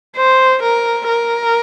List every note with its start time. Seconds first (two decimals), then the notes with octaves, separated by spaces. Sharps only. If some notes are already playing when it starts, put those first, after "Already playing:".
0.16 C5
0.62 A#4
1.09 A#4